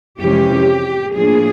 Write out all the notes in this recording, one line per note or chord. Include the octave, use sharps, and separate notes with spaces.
F2 C3 E3 G#3 C#4 G4
A2 F3 A#3 D4 G#4